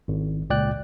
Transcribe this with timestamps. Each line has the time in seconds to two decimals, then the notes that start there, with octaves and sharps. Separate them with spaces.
0.08 G#1
0.50 C#2 A#2 D5 G5 F#6